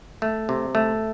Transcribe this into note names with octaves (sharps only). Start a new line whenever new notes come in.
A3
C3
A3